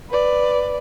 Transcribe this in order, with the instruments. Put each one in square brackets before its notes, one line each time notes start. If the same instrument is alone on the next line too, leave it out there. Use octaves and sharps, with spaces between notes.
[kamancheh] B4 D5